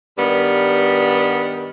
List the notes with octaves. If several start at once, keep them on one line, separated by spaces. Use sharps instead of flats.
G2 D#3 G3 B3